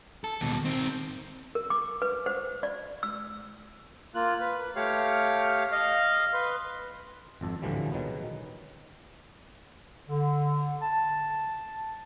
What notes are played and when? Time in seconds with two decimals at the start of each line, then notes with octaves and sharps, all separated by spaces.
0.24 A4
0.41 D#2 B2
0.65 D#3 C4
1.55 A#4
1.70 D6
2.02 B4
2.26 C5
2.63 D5
3.03 E6
4.15 A#3 F4 F#6
4.40 B4
4.76 A3 G4 C#5 F5
5.72 D#5 F5
6.33 B4 C6
7.41 G#1 F2 A4
7.62 D2 A2 D3 E3 F3 G3
7.92 B2 D#3 F#3 G#3 B3
10.09 D3
10.82 A5